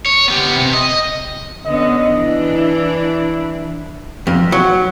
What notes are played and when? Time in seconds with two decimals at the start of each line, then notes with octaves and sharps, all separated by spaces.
0.06 C#5
0.28 B3 G4
0.55 C3
0.74 D#5
1.65 D3 B3 C#4 D#5
2.11 E3 D4
2.56 E4
4.27 F2
4.52 F#3